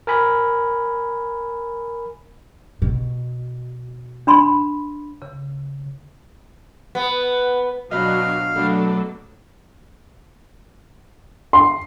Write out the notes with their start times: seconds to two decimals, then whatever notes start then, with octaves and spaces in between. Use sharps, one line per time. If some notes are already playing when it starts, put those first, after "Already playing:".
0.07 A#4 G#5 B5
2.82 B2
4.27 D4 B5 C6
5.22 C#3
6.95 B3
7.91 B2 F#3 D4 B4 D#5 F5 F6
8.56 B2 F#3 A3 D4 A4
11.53 C6